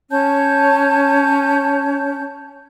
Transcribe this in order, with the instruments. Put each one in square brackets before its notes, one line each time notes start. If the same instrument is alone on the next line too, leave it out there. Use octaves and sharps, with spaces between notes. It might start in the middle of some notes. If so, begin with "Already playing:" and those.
[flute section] C#4 C#5 A5 G6